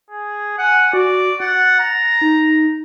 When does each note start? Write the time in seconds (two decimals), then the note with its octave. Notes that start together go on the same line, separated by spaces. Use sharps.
0.10 G#4
0.58 F#5 G#5
0.93 F#4 D5
1.40 F#5 A6
1.80 A#5
2.22 D#4